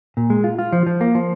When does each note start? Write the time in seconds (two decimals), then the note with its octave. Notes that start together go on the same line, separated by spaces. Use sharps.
0.17 A#2
0.30 G#3
0.44 F4
0.59 F4
0.73 F3
0.87 F3
1.01 A#3
1.15 F3